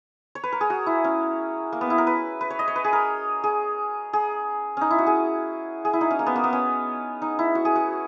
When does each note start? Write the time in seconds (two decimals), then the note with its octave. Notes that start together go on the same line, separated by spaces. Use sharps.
0.35 C#5
0.44 B4
0.52 A#4
0.61 G#4
0.70 F#4
0.86 E4
1.04 C#4
1.73 A#3
1.81 B3
1.90 E4
1.98 A#4
2.07 B4
2.41 B4
2.50 C#5
2.59 D#5
2.68 C#5
2.76 B4
2.84 G#4
2.93 A#4
3.44 G#4
4.13 G#4
4.77 C#4 D#4
4.91 E4
4.99 F#4
5.06 G#4
5.85 G#4
5.93 E4
6.01 D#4
6.11 C#4
6.19 A#3
6.26 B3
6.36 A#3
6.44 B3
6.53 C#4
7.22 D#4
7.39 E4
7.55 F#4
7.65 G#4
7.75 F#4